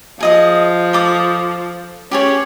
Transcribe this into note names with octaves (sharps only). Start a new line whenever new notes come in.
F3 G#4 D#5 D#6
A4 D6 D#6
C#4 G4 G#4 C#5